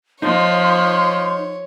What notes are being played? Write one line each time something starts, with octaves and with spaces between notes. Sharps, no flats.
F3 D#4 C#5 C6